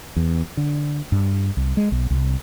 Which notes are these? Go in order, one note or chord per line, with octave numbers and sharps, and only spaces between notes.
E2
D3
G2
C2
G#3
B1
C2